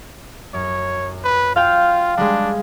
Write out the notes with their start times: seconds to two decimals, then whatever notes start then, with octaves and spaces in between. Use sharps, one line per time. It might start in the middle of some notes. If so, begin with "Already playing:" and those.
0.54 F#2 C#5
1.24 B4
1.56 F4 F5 G5
2.18 G3 G#3 D4